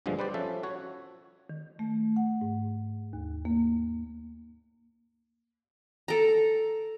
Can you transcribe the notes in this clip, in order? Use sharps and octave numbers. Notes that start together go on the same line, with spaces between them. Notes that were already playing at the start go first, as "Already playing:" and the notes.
A#1 G2 D3 F3 G#3
G3 B4 C5 D5
F3 C#4 A4 E5
F#4 C#5
D#3
A3
F#5
G#2
D#2
A#3
A4 A#5